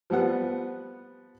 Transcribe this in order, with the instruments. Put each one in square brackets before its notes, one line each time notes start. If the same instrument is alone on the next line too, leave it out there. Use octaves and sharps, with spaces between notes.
[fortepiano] F3 G3 B3 F#5